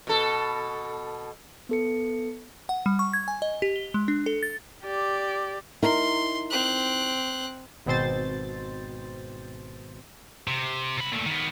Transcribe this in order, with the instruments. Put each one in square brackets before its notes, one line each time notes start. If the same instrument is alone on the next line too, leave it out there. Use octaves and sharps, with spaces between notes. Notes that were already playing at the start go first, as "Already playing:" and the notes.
[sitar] B2 A4
[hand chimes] B3 A4 C#7
[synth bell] F#5
G3
C#6
G#6
G#5
D#5
G4
G7
G#3
D4
A4
A6
[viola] G4 D5
[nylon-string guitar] D#4 E4 A#4 [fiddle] C6
[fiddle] C4 F#6
[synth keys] G#1 B2 C4 C5 A6
[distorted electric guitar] C3
C3 B5
A#2 A3
D#3 B3